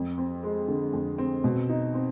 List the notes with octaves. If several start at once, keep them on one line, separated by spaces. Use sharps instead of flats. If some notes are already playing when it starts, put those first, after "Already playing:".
Already playing: F2
C4
G#3
D3
F2
C4
B2
D#4
C4